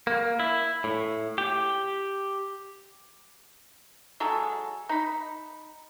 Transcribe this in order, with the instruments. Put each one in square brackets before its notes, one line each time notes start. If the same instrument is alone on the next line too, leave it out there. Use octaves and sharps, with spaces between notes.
[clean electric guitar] A#3
E4
A2
G4
[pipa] F#3 G#3 A4
D#4 B5